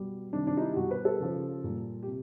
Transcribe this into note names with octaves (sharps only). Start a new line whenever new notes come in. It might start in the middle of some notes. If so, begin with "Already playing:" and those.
Already playing: B2 G3
C3 D#3 G3 D4
D4
D#4
E4
G4
B2 G3 F#4
B4
A4
C#3 F3
A#2 G3
G4
C3